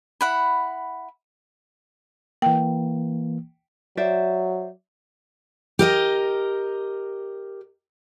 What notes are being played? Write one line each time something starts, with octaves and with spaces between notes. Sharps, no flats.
E4 F#5 B5
E3 A#3 G5
F#3 C5 D5 E5
G4 A#4 D#5